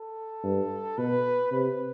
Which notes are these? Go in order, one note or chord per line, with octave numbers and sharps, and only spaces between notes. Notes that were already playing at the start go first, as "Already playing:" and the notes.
Already playing: A4
G2
B2 B4
C3 B4